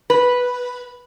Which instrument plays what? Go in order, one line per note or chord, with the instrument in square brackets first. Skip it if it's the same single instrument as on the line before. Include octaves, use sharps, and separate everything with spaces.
[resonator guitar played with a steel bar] B4